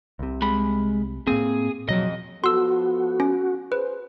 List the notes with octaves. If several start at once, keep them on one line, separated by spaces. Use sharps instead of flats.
C2 C3
G#3 B5
A2 A#3 C4 G#4
F2 B2 F#3 D#5
F3 B3 F#4 A4 C6 E6
C#4
G#4 B4 C5